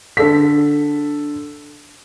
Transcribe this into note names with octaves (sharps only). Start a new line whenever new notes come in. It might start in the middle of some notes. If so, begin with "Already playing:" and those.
D3 A4 B6